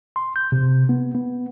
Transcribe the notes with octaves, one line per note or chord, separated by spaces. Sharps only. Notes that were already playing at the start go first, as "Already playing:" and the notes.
C6
G6
C3
B3
B3